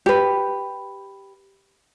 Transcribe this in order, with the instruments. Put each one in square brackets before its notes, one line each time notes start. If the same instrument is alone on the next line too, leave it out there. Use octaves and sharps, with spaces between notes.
[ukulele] G4 B4